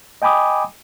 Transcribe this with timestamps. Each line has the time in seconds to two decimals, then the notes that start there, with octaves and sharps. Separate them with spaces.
0.22 D#5 G5 G#5 B5 D6 D#6